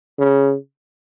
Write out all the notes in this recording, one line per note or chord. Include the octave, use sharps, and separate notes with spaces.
C#3